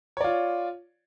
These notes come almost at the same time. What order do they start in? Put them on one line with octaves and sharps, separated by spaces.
C#5 D5 F4